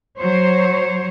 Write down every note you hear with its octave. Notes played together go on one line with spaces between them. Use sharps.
F#3 C5 C#5